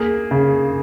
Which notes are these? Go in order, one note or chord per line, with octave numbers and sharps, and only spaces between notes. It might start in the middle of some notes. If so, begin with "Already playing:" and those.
Already playing: A#3 G#4
C#3